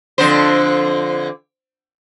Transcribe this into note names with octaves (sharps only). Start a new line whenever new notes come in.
F2 D3 C5